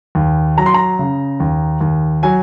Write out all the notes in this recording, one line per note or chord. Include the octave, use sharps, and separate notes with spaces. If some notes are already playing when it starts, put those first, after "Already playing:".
D#2
F#3 A#5
C6
A#5
C#3
D#2
D#2
F#3 G#5